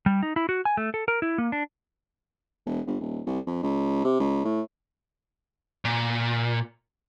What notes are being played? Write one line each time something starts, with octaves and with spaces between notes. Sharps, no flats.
G3
D#4
E4
F#4
G#5
A3
A4
A#4
E4
A#3
D4
E1
G1
D#1
C2
F2
C#2
C3
C#2
A2
A#2